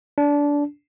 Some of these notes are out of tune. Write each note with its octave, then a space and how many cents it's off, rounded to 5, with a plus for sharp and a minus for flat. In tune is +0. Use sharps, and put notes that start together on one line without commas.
D4 -20